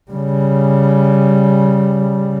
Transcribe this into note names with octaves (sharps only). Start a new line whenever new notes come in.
C#3 G3